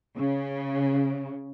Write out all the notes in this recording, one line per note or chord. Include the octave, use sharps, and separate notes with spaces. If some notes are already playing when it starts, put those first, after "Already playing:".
C#3